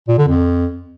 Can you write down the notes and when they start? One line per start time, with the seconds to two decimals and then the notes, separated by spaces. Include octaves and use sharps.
0.08 A#2
0.18 D3
0.28 F2